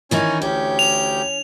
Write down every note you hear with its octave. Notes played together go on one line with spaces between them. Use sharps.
D#3 E3 C#4 D#4 C#5
D2 C#4 G4 G6
F7